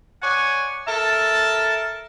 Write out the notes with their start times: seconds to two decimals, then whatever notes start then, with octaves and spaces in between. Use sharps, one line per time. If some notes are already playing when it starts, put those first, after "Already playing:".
0.23 C#5 D5 F#5 G#5
0.86 A4 A#4 E5 A5